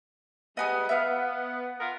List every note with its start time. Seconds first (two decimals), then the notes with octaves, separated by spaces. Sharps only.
0.57 G3 G#3 B3 D#5 G#5 D#6
0.89 B3 E5 F5
1.80 B3 F4 A#4